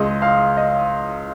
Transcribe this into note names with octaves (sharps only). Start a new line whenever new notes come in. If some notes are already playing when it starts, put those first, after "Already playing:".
Already playing: C#2 C#3 G#3 D#5
F5
D#5